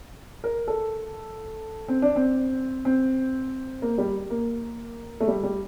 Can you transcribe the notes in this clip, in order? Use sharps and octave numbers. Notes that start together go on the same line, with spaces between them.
A#4
A4
C4
D4
C4
C4
A#3
G3
A#3
A3
G3
G3